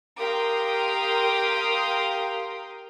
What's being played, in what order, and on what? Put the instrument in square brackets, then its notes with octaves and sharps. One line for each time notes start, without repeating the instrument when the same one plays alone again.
[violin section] G4 A#4 F5 G5 C6 D#6